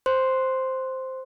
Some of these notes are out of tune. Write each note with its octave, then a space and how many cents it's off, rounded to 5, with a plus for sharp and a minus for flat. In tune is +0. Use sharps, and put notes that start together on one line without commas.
C5 +0 C6 +0